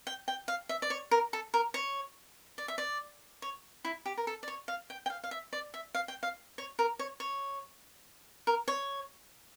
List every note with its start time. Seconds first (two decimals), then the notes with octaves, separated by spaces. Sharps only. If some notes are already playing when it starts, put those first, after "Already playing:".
0.07 G5
0.28 G5
0.48 F5
0.69 E5
0.82 D5
0.90 C#5
1.11 A#4
1.33 A4
1.54 A#4
1.74 C#5
2.58 D5
2.68 E5
2.78 D5
3.42 C#5
3.85 E4
4.06 G4
4.17 A#4
4.27 A4
4.43 D5
4.48 C#5
4.68 F5
4.90 G5
5.06 G5
5.10 F5
5.24 F5
5.31 E5
5.53 D5
5.74 E5
5.95 F5
6.08 G5
6.23 F5
6.58 C#5
6.79 A#4
6.99 C#5
7.20 C#5
8.47 A#4
8.68 C#5